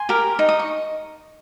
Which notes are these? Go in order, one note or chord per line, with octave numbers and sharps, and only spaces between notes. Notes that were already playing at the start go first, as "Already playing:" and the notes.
Already playing: G#5 C6
G4 A#4
D#4
D#6
C#6